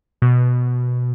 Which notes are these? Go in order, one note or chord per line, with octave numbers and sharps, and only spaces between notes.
B2